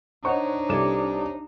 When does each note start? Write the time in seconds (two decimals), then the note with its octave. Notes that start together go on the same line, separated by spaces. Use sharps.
0.25 D4 D#4 C5 C#5 D#5 F#5 C#6
0.69 C2 G4 A4 D5 D6 E7